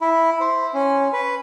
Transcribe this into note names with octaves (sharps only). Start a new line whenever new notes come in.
E4
C5
C#4
B4